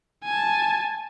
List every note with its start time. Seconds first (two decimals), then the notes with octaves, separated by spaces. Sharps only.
0.24 G#5 A5